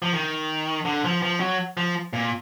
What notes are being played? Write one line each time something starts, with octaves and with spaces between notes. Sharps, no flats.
F3
D#3
D3
F3
F3
F#3
F3
A#2